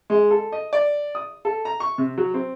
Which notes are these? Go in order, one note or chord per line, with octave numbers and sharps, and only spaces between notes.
G#3
A4
D#5
D5
D#6
A4
A#5
C#6
C3
F#3
C4